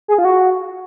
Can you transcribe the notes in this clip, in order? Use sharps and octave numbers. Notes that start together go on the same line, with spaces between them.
G#4
F4
F#4